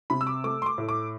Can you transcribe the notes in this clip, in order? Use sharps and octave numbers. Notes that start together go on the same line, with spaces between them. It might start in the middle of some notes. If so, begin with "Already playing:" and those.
C3 B5
E6
D6
A3 D6
C6
D6
A2
D6